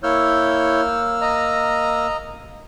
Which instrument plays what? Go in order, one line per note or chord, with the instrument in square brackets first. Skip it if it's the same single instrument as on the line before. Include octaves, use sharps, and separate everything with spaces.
[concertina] A#3 E6 F6 [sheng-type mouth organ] E4 C#5 G6
[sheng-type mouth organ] D#5 A#5